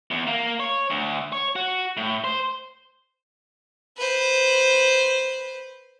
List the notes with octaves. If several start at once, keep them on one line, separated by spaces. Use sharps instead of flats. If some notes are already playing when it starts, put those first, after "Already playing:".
E2
A#3
C#5
D2
C#5
F#4
A2
C5
B4 C5